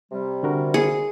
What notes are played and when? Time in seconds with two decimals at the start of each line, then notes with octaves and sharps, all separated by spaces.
0.12 C3 G3
0.43 D3 F#4 A#4
0.74 G#4